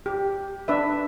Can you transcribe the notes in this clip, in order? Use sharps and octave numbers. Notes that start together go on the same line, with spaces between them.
G4
D4 B4 E5